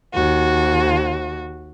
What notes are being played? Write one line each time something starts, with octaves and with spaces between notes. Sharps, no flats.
D#2 F#4